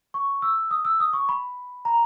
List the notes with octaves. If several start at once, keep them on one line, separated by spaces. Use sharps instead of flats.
C#6
E6
D#6
E6
D#6
C#6
B5
A#5